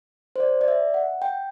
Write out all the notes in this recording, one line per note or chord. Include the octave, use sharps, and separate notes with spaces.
C5
D5
D5
E5
F#5
G5